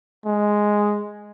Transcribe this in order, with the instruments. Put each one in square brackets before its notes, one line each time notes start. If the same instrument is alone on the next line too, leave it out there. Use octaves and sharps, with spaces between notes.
[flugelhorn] G#3